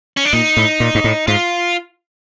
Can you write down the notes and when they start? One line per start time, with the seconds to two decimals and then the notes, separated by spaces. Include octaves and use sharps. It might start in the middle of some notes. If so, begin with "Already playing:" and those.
0.17 C#4
0.25 D4
0.33 A#2 D#4
0.57 A2
0.80 A#2
0.95 G#2
1.04 A2
1.27 G#2 F4